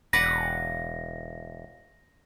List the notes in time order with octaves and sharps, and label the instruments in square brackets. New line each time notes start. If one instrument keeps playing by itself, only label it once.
[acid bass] E1 [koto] B4 D5 F#5 [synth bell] A#6